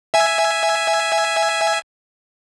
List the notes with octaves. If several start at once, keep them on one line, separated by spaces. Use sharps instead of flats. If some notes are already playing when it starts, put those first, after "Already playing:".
E5 G#5